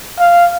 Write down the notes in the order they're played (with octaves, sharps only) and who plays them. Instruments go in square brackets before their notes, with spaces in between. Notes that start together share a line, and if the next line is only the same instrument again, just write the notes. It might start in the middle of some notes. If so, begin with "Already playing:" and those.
[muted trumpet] F5